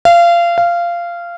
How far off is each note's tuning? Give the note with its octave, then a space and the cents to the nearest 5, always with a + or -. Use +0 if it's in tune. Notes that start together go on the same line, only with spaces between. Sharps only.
F5 -25
F5 -15